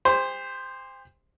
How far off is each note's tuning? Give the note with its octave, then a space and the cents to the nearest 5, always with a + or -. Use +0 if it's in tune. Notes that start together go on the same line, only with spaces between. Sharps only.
G4 +40 C5 -5